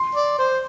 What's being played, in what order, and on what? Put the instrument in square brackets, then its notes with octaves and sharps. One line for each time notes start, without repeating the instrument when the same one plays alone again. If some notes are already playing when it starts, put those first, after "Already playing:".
Already playing: [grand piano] C6
[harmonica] D5
C5